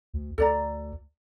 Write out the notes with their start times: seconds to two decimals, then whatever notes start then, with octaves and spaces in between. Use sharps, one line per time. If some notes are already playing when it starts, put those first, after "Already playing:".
0.14 D2
0.38 D2 A4 D5 A#5